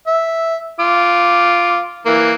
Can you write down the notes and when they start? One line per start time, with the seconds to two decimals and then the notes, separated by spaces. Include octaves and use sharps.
0.07 E5
0.80 F4 D6
2.06 E3 A#3